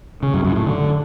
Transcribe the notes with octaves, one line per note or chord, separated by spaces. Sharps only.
C#3
F#2
F#2
A2
D3